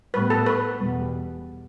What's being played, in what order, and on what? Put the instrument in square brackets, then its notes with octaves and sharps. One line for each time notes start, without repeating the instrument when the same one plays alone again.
[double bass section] A2 G3 B3 [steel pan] B4
[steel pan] A4
B4
[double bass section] E2 B2 G3 B3